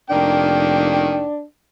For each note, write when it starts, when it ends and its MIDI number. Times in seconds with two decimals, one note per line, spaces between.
0.10 1.23 29
0.10 1.26 51
0.10 1.26 58
0.10 1.43 62
0.10 1.26 79